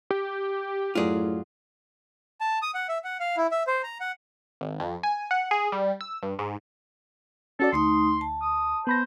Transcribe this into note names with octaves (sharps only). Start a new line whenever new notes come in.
G4
F#2 A2 F4 F#4 G#4 D5
A5
D#6
F#5
E5
F#5
F5
E4
E5
C5
A#5
F#5
G#1
F2
G#5
F#5
G#4
G3
E6
G2
G#2
C#4 F#4 A4 D5
D2 A3 D#4 C6 D#6
A5
D#6
B3 C5 B5 A#6